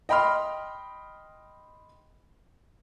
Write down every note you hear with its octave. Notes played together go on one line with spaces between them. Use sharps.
D#5 G5 B5 C6 F6